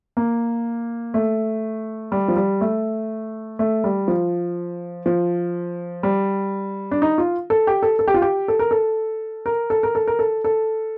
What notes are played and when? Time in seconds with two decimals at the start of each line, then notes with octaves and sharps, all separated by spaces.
0.17 A#3
1.14 A3
2.12 G3
2.28 F3
2.36 G3
2.61 A3
3.59 A3
3.84 G3
4.08 F3
5.06 F3
6.03 G3
6.91 D4
7.02 D#4
7.18 F4
7.50 A4
7.67 G4
7.83 A4
7.99 A4
8.08 G4
8.14 F4
8.22 G4
8.48 A4
8.59 A#4
8.71 A4
9.46 A#4
9.70 A4
9.83 A#4
9.95 A4
10.08 A#4
10.19 A4
10.44 A4